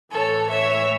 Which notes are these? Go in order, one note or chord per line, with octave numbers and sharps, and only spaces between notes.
A2 E3 A4 C#5
C#5 E5